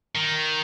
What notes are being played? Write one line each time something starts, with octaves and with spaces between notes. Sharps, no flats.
D#3